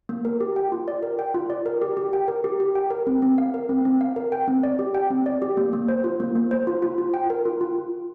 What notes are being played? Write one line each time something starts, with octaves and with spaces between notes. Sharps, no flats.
A#3
A#4
G4
G5
F4
D5
A#4
G5
F4
D5
A#4
G4
G4
G5
A#4
G4
G4
G5
A#4
C4
C4
F5
A#4
C4
C4
F5
A#4
G5
C4
D5
G4
G5
C4
D5
G4
A#3
A#3
C5
F4
A#3
A#3
C5
F4
F4
F4
G5
A#4
F4
F4